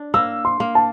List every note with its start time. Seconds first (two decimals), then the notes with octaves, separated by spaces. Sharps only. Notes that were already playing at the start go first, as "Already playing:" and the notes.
Already playing: D4
0.14 A#3 E6
0.45 C6
0.60 A#3
0.75 A5